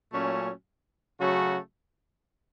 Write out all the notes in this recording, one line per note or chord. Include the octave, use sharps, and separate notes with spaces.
A#2 F#3 A3 C#4
C#3 F#3 A3 C#4 F#4